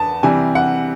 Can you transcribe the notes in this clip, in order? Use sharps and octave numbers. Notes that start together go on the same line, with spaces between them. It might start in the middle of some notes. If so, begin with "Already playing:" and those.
Already playing: E2 B3 A5
C3 E3 G3 G#5
F#5